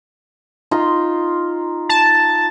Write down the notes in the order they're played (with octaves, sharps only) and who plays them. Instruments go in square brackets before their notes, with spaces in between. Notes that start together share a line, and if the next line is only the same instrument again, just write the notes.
[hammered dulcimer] D#4 F4 C6
[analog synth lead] A5